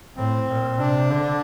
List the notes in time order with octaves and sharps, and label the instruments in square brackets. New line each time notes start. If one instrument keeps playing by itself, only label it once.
[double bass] A2 [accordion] C4
[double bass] A#2
[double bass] C3 [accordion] D4
[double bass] D3